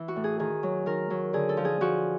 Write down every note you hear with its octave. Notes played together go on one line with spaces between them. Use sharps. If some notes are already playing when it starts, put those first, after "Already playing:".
Already playing: E3
F#4
A2
G#4
D#3 G#4
F#3
D#3 A#4
F#3
D3 G#4
A4
F3
G#4
F3 F#4